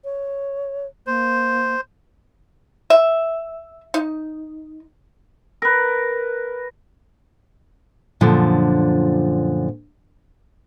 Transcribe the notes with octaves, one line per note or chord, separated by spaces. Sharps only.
C#5
A#3 C5
E5
D#4
A#4 B4
F#2 A#2 D3 F3